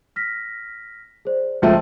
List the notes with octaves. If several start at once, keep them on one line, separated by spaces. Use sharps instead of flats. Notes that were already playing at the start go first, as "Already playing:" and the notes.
F6 A#6 B6
G#4 C5 D5
C#2 F3 A3 G#4 C5 E5